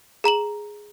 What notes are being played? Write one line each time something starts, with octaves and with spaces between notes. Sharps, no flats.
G#4 A#5 E7 F#7